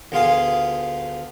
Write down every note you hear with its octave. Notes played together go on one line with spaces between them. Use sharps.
D2 B3 F4 G#4 F5 D#6